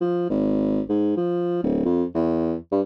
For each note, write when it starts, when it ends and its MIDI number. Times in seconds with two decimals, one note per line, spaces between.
0.01 0.28 53
0.30 0.81 32
0.89 1.17 44
1.17 1.60 53
1.63 1.81 26
1.85 2.04 41
2.15 2.55 40
2.72 2.81 43